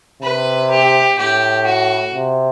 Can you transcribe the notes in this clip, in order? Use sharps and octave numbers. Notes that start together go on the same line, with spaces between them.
C3 B4
G4
A2 G4
F#4
C3